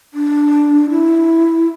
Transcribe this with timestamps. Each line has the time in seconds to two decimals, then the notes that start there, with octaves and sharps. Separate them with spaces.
0.14 D4
0.89 E4